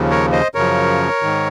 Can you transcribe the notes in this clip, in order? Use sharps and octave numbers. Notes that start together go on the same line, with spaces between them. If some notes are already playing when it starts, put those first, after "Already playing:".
Already playing: D#2 C#3 F3
A#4 C#5
C5 D#5
F#2 C#3 F3 A#4 C#5
G#2 D#3